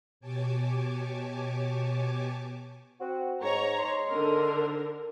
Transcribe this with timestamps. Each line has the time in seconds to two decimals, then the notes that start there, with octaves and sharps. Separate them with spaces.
0.20 B2 G4 C#5 G#5 A5 D6
3.01 C4 F#4
3.43 G#2 C#5 A#5
3.79 G#2 D#4 C6
4.12 D3 A#4